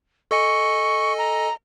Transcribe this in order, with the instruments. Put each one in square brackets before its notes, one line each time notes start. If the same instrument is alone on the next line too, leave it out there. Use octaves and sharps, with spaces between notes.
[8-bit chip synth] A4 D#5 G#5 [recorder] C#6
[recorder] A#5